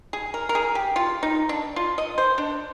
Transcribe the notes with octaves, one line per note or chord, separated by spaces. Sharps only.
G#4
A#4
A#4
G#4
G4
F4
D#4
D4
F4
D#5
C5
D4